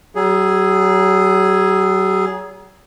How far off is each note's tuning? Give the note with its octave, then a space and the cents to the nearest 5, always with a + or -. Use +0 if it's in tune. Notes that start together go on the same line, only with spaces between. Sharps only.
F#3 +40 G#4 +0